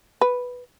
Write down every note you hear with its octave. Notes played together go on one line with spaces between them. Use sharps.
B4